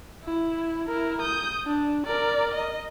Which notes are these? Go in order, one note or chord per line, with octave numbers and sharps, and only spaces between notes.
E4
E4 A#4
D#6 G6
D4
A#4 D5
D#5